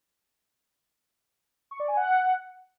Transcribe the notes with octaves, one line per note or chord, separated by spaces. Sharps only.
C#6
D5
G#5
F#5